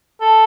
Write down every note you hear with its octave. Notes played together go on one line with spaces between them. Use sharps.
A4